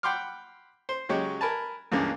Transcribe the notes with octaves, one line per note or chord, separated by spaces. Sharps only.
F#5 G5 B5 C6 D6 F6
C5
C#3 F#3 G#3 G4 C#5
A#4 B4 G#5 A5
C#2 G2 C#3 E3 G#3 A#3